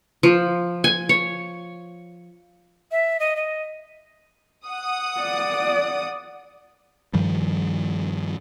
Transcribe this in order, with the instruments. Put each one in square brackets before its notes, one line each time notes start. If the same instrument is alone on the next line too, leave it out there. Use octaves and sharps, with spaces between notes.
[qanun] F3
G#5
C#5
[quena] E5
D#5
D#5
[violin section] F#5 D#6
[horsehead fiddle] D5
[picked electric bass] G2 D#3 F3 G3